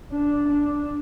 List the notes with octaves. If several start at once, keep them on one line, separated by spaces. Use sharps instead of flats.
D4
D4